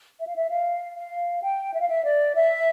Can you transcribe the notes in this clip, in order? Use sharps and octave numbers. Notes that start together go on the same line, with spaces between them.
E5
F5
E5
F5
F5
G5
E5
F5
E5
D5
E5